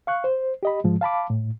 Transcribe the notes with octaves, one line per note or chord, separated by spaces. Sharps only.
F5 C#6 F#6
C5
G4 D#5 B5
G#2 F3 G#3
F5 A5 B5 D6
A2